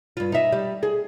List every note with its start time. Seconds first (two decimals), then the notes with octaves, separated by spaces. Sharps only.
0.17 G2 F4
0.32 D#4 E5
0.52 G3
0.83 G#4